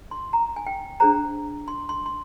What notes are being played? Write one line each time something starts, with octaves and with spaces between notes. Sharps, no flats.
C6
A#5
G#5
G5
D4 G#4 C5 A#5
C6
C6
C6